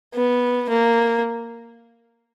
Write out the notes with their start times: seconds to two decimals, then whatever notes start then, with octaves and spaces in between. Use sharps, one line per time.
0.14 B3
0.70 A#3